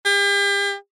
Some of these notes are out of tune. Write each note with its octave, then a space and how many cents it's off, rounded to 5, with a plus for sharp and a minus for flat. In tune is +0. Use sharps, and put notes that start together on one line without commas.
G4 +40